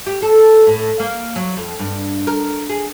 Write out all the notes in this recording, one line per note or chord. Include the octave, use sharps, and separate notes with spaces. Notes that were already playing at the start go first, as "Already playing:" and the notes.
G4
A4
A2
A#3
F#3
F2
G2
A#4
G#4